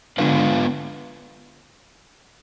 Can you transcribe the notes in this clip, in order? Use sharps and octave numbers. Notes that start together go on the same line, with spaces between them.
D3 G#3 B3 F4 B4 F5